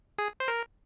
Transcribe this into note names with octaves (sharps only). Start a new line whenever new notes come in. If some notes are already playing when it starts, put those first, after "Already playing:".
G#4
C5
A#4